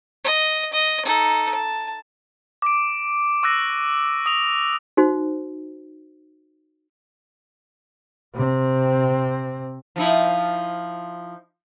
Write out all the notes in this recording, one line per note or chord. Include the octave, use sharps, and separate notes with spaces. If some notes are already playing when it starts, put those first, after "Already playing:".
D#5
D#5
D#4 A4
A5
D6 D7
C#6 E6 F#6 A#6
D#6 F7
D#4 F#4 C5
C3 C4
F3 D#4 E4